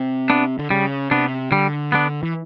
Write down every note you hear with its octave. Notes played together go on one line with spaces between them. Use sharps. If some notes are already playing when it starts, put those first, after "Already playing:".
Already playing: C3
B3 D4
D3
C#3 G3
C3 B3 D4
D3 G3
B3 D4
E3